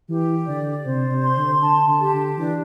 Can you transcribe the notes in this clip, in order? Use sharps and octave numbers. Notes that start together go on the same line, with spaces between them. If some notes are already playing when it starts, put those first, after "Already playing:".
E3 G4
D3 D5
C3 C5
C3
C6
D3
D3 A5
D3
G4
D3
E3 D4